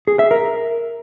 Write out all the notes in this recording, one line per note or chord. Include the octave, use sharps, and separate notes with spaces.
G#4
E5
A#4